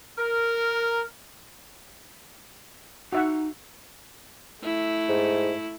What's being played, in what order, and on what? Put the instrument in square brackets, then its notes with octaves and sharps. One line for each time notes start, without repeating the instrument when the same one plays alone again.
[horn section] A#4
[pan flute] D#4 [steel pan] F#4 E5 F#5
[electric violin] A3 E4
[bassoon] G#2